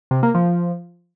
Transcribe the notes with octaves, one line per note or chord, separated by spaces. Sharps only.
C3
A#3
F3